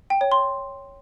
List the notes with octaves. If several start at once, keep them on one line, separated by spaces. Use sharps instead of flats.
G5
C#5
C6